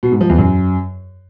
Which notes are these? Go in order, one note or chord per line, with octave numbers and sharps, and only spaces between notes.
B2
G#2
F3
E2
F#2